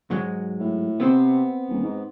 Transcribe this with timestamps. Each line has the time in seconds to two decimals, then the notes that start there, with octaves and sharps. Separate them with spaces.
0.10 G#2 F#3 G#3
0.59 A2
1.00 C3 B3 C4 C5
1.69 D#1
1.83 G#2